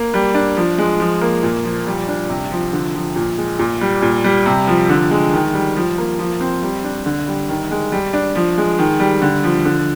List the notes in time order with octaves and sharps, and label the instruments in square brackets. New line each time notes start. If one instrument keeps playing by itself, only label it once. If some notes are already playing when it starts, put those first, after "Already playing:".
Already playing: [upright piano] A#3
G3
D4
F3
G#3
F3
A#3
A#2
F3
G3
D4
C3
F3
D3
F3
A#2
G#3
A#2
G3
A#2
G3
C3
F3
D3
G#3
D#3
G3
F3
A#3
F3
C4
G3
D4
D3
G3
D#3
G#3
G3
D4
F3
G#3
D#3
G3
D3
F3
D3